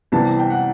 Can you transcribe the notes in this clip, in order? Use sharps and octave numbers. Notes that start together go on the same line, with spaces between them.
C2 C3 E3 B3 A5
G5
F#5